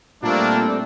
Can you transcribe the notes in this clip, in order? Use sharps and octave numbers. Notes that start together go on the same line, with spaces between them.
A#2 G3 A3 A#3 C4 D4